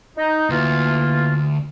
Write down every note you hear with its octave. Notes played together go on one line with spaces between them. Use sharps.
D#4
D2 E3 A#3 F4